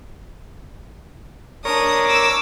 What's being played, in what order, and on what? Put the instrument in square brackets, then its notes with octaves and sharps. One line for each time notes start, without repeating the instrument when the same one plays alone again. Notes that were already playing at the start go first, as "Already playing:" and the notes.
[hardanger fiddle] D4 [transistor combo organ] A#4 C#5 [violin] D#6
[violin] D6 E6